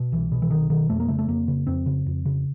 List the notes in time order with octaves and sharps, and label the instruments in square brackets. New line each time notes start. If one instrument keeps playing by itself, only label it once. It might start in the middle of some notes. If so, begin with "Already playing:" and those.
Already playing: [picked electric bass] B2
C2 E3
B2
E3
C2 D#3
B2 D#3
F2 A3
A#3
C#3 A3
A3
F2 A#3
C#3
F2 C4
C#3
F2
C#3